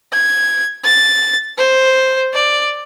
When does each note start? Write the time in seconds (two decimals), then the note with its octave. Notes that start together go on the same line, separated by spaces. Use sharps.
0.13 G#6
0.84 A6
1.58 C5
2.34 D5